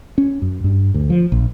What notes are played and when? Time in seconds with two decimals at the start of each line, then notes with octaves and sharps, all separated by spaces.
0.18 C#4
0.42 F#2
0.64 G2
0.94 D2
1.10 F3
1.32 A#1